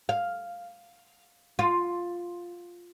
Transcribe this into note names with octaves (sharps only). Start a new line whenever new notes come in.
F5
F4